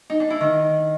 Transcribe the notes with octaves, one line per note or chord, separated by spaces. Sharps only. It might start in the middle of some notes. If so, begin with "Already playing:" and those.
D#4
D4
E4
D#3